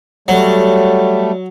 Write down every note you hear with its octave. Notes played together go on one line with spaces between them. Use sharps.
F#3 G3 A3